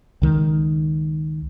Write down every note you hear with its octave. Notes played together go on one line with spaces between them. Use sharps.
C#2 D#3 G#3